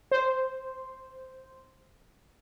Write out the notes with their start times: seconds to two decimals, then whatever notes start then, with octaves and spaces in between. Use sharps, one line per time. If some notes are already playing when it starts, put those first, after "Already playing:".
0.11 C5